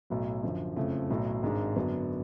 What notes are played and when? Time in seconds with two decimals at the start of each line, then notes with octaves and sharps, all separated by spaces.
0.10 B1 A2 F#3
0.43 F#2 D3 F3
0.76 F#1 F2 C#3 F3 A3
1.10 B1 A2 F#3
1.43 G#1 G#2 G#3 D4
1.76 F#2 D3 F#3 B3 D4